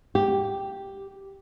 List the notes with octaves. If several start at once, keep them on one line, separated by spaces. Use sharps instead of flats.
G4